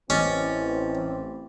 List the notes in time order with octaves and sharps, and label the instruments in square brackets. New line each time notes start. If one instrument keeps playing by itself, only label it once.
[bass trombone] A1 [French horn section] E3 C4 [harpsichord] C#4 [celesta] D#5 D6 A6